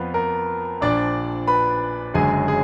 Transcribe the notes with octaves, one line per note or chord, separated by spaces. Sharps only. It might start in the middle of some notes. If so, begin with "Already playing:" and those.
Already playing: F2 F3 B3 F4 B4
A#4
A#1 A#2 F3 D4 D5
B4 B5
F#1 F#2 D3 G#3 G#4 G#5
G#4